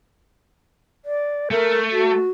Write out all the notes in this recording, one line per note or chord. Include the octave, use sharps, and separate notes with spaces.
D5
A3 A#4
F#4